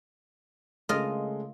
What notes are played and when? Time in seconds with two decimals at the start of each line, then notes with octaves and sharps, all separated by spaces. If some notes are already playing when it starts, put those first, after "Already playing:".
0.89 C#3 G#3 A3 F4 A#4 D#5